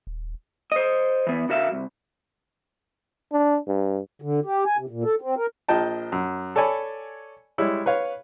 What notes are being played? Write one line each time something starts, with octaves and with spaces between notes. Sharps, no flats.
D#1
C5 D#5
E3 B3
D3 F#4 A#4 E5 F5
C2
D4
G2
D3
G4
G#5
C3
A#2
A4
C4
A#4
A#1 F3 D#5 G5 A5
F#2
A4 C#5 D5 G#5 B5
G3 G#3 E4 C#5
B4 C#5 F5